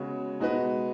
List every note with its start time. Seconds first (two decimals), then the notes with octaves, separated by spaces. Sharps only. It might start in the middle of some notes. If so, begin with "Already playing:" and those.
Already playing: C#3 G#3 B3 F#4 C#5
0.40 B2 G#3 D#4 F#4 B4